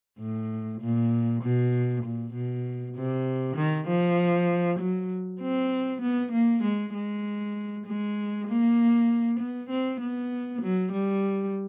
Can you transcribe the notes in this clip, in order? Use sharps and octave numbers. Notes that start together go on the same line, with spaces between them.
A2
A#2
B2
A#2
B2
C3
D#3
F3
F#3
C4
B3
A#3
G#3
G#3
G#3
A#3
B3
C4
B3
F#3
G3